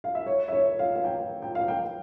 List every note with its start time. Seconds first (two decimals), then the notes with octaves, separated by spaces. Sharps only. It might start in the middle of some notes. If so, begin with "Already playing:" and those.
0.04 F5
0.15 E5
0.26 C#5
0.48 E5
0.53 C#5
0.79 F5
0.95 F5
1.04 G5
1.42 G5
1.55 F5
1.68 G5